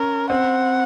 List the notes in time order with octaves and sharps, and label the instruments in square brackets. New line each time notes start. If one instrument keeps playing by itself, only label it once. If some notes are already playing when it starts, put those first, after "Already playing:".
Already playing: [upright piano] C#4 [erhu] A#4
[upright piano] C4 [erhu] F#5